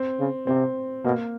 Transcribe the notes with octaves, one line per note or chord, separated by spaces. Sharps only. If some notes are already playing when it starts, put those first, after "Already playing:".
Already playing: C4
C#3
C3 C4
B2 A#3